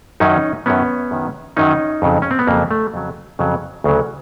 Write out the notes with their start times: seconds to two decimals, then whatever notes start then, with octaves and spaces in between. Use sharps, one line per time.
0.20 F#2 D#3 F#3 C#4 D#4
0.66 F#2 D#3 F#3 B3 C#4
1.11 F#2 D#3 F#3
1.57 F#2 D#3 F#3 C#4 D#4
2.02 F2 C#3 F#3
2.22 C#4
2.31 C4
2.39 B3
2.47 F2 C#3 F#3 A#3
2.71 A3
2.94 F2 C#3 F#3
3.39 F2 C#3 F#3
3.84 D2 C#3 F#3